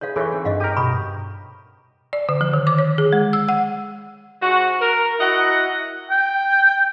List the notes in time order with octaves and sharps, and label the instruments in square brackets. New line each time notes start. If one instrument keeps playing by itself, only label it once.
[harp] D#4 G#4 B4 [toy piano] C#5 F5
[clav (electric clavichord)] E3 [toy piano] A4 E5 C#6 [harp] C#5
[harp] C4
[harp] G2 [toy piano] D#5 F5 F#5
[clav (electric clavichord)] G4 A#4 [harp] D#7
[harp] B2 [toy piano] B5 C#6 D#6
[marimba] D5
D3
F3
D#3
D6
C#5
G#4
G#3
E6
F#5
[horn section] G#2 F#4
A#4
E4 F#4 D#5 F#5
[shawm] G5